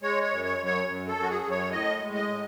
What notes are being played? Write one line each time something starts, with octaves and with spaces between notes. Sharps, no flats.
G#3 C#5
C#5
F#2
C#5
F#2
C#5
F#2
A4
F#2
F#4
G#4
F#2
C#5
A2 D#5
G#3
D#5
A2